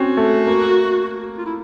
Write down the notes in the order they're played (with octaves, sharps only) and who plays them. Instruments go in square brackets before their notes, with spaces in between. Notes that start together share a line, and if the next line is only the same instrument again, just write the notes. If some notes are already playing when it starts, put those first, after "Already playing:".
Already playing: [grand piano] C4 C#4 [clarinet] F#4
[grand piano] A3
A#3
[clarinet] F4
E4